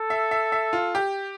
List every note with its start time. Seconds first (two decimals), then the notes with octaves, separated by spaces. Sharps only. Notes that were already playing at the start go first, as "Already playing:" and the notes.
Already playing: A4
0.10 E5
0.31 E5
0.52 E5
0.73 F4
0.95 G4